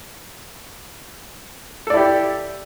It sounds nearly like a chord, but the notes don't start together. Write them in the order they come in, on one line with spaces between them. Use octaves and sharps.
A4 D5 E4 G4